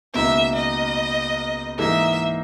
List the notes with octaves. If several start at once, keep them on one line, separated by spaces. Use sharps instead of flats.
C#2 B2 A#3 D#4 E5
D#5
G#2 E3 A#3 D#4 G#4 E5